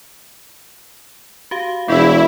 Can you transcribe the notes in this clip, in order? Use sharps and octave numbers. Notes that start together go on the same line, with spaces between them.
F#4 G4 F5
E1 B3 E4 G#4 D5